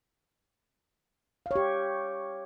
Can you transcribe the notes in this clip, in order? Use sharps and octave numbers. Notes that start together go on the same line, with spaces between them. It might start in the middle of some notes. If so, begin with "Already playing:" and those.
G4 C#5 F5